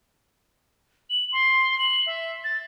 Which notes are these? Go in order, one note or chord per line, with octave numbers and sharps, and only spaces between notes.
F#7
C6
F#7
E5
A6